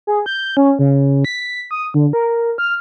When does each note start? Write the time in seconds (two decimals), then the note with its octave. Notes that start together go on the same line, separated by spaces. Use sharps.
0.07 G#4
0.26 G6
0.57 C#4
0.79 C#3
1.25 B6
1.71 D#6
1.94 D3
2.13 A#4
2.58 F6